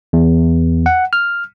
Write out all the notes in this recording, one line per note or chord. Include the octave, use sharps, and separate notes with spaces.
E2
F#5
F6